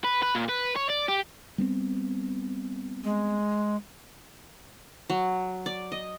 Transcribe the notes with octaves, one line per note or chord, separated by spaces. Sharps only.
B4
B4
A#2
B4
C#5
D5
G4
G3 B3 C4
G#3
F#3
D5
D#5